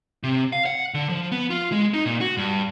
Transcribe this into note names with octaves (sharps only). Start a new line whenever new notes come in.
C3
F5
F#5
D3
F3
B3
F4
G#3
D#4
A#2
F#4
G2